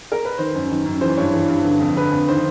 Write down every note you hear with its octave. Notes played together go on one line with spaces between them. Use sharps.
A#4
B4
D#3 C5
F#2
D#3
F#2
E3 C5
G2 C#5
E3
G2
D3
F2
D3 B4
F2
D#3 C5